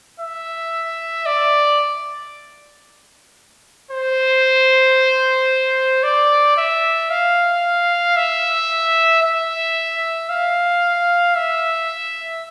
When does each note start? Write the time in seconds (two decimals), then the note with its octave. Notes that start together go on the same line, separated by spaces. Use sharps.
0.20 E5
1.26 D5
3.91 C5
6.03 D5
6.57 E5
7.10 F5
8.16 E5
9.22 E5
10.29 F5
11.35 E5